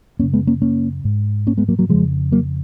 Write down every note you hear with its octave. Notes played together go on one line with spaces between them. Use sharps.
F#2 C#3 A#3 C#4
G#3 B3
A#3 C#4
A#3 C#4
G#2
A#3 C#4
G#3 B3
F#3 A#3
F#3 A#3
F2 C#3 F3 G#3
F#3 A#3